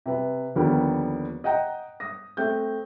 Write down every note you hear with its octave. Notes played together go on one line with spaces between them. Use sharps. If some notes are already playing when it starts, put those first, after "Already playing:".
C3 B4
D#2 D3 F3 G3 A#3 B3
D#5 F#5 G5 A#5
D#6 A#6
A3 C4 G6